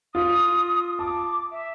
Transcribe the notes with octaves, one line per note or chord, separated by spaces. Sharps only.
F4 D#6
A5 D6
E5